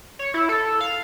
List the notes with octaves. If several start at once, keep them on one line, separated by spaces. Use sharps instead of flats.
C#5
E4
A4
F5